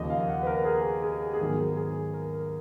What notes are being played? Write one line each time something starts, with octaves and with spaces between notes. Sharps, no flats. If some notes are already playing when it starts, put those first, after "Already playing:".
Already playing: D#2 C#3 F3 D#5
F5
F#5
B4
A#4
G#4
G#4
G#4
G#2 D#3 F#3 B3 A#4
G#4
A#4
A#4